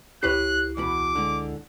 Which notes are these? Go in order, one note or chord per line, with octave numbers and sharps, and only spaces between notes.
C#2 E4 G4 B4 C#5 F#6 C7
E2 B2 B5 D6
D3 G#3